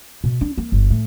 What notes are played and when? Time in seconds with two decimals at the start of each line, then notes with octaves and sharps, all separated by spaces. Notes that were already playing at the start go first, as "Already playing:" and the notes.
0.24 B2
0.41 D4
0.58 A#3
0.72 G1
0.90 A2